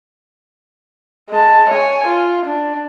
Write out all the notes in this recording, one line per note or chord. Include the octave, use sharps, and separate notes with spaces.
G#3 A5
C#5 G#5
F4
D4